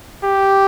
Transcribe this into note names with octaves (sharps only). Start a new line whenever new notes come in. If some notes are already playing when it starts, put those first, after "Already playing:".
G4